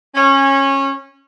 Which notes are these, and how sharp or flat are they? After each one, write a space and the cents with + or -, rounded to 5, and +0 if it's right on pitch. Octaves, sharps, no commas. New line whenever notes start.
C#4 -20